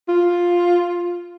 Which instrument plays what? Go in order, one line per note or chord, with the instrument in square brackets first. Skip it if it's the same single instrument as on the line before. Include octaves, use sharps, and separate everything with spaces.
[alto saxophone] F4